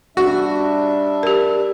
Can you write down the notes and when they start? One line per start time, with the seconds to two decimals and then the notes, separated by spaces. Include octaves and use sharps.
0.17 G3 D4 F#4 E5
1.23 G4 A#4